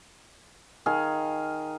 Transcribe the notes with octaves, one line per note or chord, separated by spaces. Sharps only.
D#3 G#4 F5